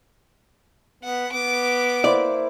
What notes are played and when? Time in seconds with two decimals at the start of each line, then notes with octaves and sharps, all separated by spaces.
1.04 B3 F#5
1.32 B3 D6
2.04 A#3 E4 C5 D5